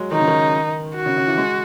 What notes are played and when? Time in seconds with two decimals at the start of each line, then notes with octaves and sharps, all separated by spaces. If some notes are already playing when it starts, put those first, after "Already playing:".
Already playing: F#3 G#3
0.12 D#3 D#4
0.20 C#3
0.27 D#3
0.96 F#4
1.06 C#3
1.17 C#3
1.27 E3
1.38 G#3